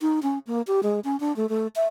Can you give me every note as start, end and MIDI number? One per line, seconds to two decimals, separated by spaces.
0.02 0.20 63
0.23 0.39 61
0.47 0.62 58
0.67 0.81 67
0.83 1.00 56
1.04 1.19 61
1.20 1.35 62
1.36 1.49 57
1.49 1.67 57
1.76 1.86 76